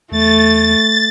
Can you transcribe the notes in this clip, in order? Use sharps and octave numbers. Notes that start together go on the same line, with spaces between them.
E2 A3 A6